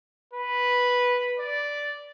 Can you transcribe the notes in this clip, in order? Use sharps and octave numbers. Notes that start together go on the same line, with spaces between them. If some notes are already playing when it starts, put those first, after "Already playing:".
B4
D5